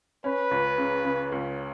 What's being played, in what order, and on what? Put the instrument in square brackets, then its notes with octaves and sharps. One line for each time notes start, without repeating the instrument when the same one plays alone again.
[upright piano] C#4 [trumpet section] B4
[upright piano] C#2
C#3
C#3
C#2